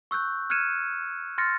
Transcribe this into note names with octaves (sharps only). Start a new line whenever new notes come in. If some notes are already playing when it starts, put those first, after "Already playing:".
C#6 E6 F#6 G6
F6 F#6 G#6 C#7 D#7 E7
C6 F6 A6 A#6 C#7